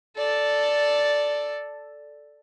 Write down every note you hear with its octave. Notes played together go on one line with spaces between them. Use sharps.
A4 D5